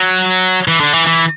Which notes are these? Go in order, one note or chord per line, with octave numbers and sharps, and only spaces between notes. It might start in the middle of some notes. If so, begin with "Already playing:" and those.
Already playing: F#3
E3
D3
E3
E3